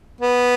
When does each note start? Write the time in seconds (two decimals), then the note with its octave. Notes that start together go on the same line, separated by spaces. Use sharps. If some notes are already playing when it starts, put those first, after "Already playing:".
0.21 B3